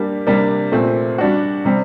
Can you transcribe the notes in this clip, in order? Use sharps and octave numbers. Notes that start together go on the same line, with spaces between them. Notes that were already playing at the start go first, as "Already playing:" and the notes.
Already playing: G3 A#3 D4 G4
C3 G3 A#3 D4
A#2 A3 C4
G3 D4 F#4
C3 G3 C4